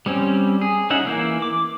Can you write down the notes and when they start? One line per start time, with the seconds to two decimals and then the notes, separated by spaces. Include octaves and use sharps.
0.06 G3 C4 C#4
0.61 G#4
0.90 C#4 D#4 E5 F#5
1.05 E3 A#3 E4
1.42 D6